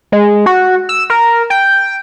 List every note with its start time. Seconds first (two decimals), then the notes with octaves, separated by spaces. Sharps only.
0.12 G#3
0.46 F#4
0.89 E6
1.10 A#4
1.50 G5